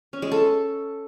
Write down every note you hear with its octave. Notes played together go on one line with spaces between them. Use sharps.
C#4
G#3
A4